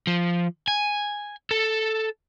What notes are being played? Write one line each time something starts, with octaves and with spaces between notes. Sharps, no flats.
F3
G#5
A4